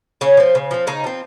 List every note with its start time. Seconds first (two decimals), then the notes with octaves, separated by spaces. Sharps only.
0.21 C#3 C#4
0.37 F3 C4
0.55 C#3
0.71 F3 C4
0.87 C#3 D#4
1.04 F3 C4